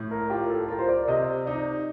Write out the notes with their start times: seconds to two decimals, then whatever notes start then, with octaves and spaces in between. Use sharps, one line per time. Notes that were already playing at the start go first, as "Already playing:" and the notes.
Already playing: A2
0.11 A#4
0.30 F4 G4
0.50 A4
0.69 F4 A#4
0.79 C5
0.89 D5
1.08 C3 D#5
1.46 D#4 D5